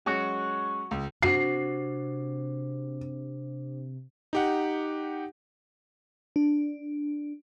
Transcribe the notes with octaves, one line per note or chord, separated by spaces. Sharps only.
F#3 G#3 C#4 F#4
C#2
C3 D4 F#4 C5 C7
D#4 G4 F#5
D4